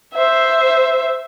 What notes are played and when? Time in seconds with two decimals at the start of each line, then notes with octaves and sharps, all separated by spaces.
0.14 C5 E5